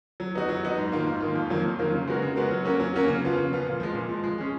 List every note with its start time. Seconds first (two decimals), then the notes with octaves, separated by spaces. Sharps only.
0.20 F#3
0.35 B3 D#4 F#4
0.49 F#3
0.63 B3 D#4 F#4
0.78 G#2
0.92 D#3 A#3 F4
1.07 G#2
1.21 D#3 A#3 F4
1.35 F2
1.50 D#3 F#3 A#3 F4
1.65 F2
1.79 D#3 F#3 A#3 F4
1.94 C#3
2.07 G#3 B3 F#4 A#4
2.22 C#3
2.36 G#3 B3 F#4 A#4
2.51 F#3
2.65 A#3 C#4 F#4
2.80 F#3
2.94 A#3 C#4 F#4
3.08 C#3
3.23 F3 B3 F4
3.38 C#3
3.51 F3 B3 F4
3.67 A#2
3.80 F3 G#3
3.94 A#2
4.09 F3 G#3
4.24 G#3
4.38 C#4 G#4